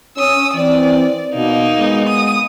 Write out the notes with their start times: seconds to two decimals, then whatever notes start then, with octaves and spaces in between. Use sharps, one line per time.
0.17 C#4 D#6 E6
0.54 E3 C4 D5
1.34 B2 A#3 D#4
1.79 G#3 B3
2.09 D#6